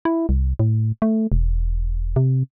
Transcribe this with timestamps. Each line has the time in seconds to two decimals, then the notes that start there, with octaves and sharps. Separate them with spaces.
0.05 E4
0.29 C2
0.59 A2
1.02 A3
1.32 E1
2.16 C3